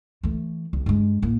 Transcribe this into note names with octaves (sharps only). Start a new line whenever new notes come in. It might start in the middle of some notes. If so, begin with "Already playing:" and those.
E3 A3
C2
G2 G#3
A2 A#3